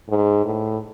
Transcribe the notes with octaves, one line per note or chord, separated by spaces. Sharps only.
G#2
A2